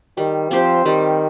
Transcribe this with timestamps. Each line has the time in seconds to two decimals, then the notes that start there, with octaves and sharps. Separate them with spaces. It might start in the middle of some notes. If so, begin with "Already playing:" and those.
0.17 D#3 G3
0.51 F3 C4 G4 C5
0.85 D#3 G3